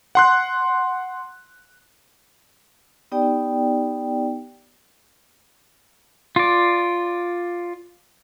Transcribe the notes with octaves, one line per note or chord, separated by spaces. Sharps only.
F#5 C6 F#6
B3 D#4 G4 D5 G5
F4 D5